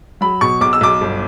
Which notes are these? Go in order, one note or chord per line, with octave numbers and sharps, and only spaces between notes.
F#3 B5
B2 C#6
B1 D6
E6
B1 D6
G1